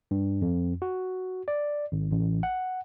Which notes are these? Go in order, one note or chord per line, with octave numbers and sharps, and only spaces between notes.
G2
F2
F#4
D5
G#1
A1
F#5